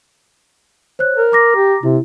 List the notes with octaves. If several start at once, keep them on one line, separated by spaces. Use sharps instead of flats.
C5 C#5 F#6
A#4
A#5 D6 A#6
G4
C3 E4